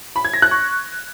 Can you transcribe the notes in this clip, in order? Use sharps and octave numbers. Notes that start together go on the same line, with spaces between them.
B5
G#6
A#6
F#6
C#6